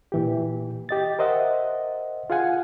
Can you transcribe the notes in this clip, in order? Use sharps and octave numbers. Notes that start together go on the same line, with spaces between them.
A#2 E3 G4
G4 D#5 A6
A#4 C5 D#5 E5 F#5
F4 G#4 F5 F#5 G#5